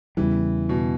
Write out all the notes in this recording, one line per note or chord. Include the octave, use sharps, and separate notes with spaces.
E2 C#3 E3 G3
B2